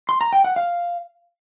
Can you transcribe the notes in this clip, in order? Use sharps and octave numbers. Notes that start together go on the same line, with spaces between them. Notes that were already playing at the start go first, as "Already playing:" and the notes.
C6
A#5
G5
F#5
F5